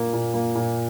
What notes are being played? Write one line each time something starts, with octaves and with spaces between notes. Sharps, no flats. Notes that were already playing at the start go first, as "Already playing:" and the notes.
Already playing: A#2 A#3
A#2
A#3
A#2